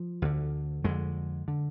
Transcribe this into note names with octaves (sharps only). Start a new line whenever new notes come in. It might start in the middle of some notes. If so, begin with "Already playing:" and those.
Already playing: F3
D2 D3
F2 D3 G#3
D3